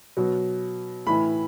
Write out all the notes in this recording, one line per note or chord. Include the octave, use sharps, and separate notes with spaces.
B2 F#3
A2 E3 B5